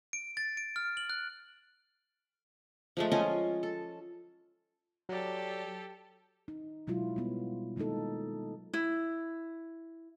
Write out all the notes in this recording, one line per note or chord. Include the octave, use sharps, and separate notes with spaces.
D7
A6
D7
F6
F#7
F#6
F3 G#3 A3
C#4 F4 D#5 G#5
A4
F#3 G4 A4 D5
D#4
B2 F#3 G#3 E4 F4
G3 B3
D#3 G#3 A#3 D#4 A4
E4